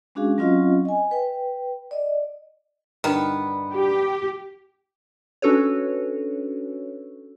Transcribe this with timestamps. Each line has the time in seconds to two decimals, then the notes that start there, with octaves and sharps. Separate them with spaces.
0.15 G#3 C#4 D4 F#4 G#4 F5
0.38 F#3 C4 C#4 F4 D#5 F5
0.85 D#5 G#5
1.11 B4 G5
1.91 D5 D#5
3.04 G2 D3 D#3 B3 D#4
3.72 G4
5.42 C#4 D4 F#4 A4 B4 C#5